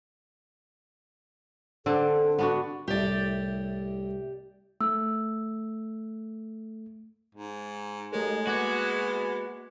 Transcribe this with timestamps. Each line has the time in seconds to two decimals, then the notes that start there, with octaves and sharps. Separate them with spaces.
1.86 D3 C4 D4 A4
2.39 B3 D4 F#4
2.88 C2 A2 G4 D5
4.81 A3 E6
7.35 G#2
8.13 D#2 G#3 A3 A4
8.47 A#3 B3 F#4 D6 G#6